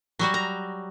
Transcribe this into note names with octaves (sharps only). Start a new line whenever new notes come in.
F#3 G3 F#4
A#5